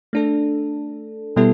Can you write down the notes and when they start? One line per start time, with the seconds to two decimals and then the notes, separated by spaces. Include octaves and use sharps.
0.13 A3 D4 A4
1.36 B2 G3 B3 E4 A4